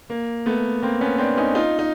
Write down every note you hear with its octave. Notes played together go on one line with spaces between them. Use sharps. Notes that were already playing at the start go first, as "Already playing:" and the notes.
A#3
A3 B3
A#3 C4
B3 C#4
C4 D4
C#4 D#4
D#4 F4
D#4